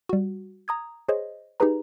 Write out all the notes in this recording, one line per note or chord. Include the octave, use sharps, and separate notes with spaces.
G3 F#4
A#5 D#6 G#6
G#4 C5 C#5 D#5
D#4 G4 G#4 B4 A#5